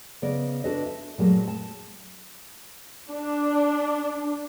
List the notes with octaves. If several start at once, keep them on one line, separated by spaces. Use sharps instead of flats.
C#3 B3 D5 D#5
D4 E4 F#4 A4 B4 D#5
E5
A#2 F#3 G#3 A3
A5
D4